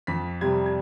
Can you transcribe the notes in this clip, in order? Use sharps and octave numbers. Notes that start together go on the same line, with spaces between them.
F2 B6
C3 G3 G#6
G#6